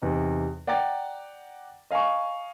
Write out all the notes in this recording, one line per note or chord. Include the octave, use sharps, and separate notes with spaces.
E2 C3 D#4
D5 F#5 G5 A#5 D6 A6
D#5 F5 G#5 A#5 C#6